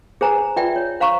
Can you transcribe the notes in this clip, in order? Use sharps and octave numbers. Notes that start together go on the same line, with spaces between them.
G#4 B4 C5 G#5 A#5
C5
F4 B4 D5 E5 G5
C#5
C5 F5 A#5 C#6